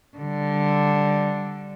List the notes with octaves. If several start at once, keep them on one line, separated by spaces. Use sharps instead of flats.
D3 G3